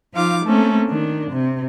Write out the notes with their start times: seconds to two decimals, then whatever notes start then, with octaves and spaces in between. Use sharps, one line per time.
0.13 F3 D#4 F4 F5 D6
0.44 A3 A#3 C4 C#4 A4
0.86 D#3 D4
1.31 C3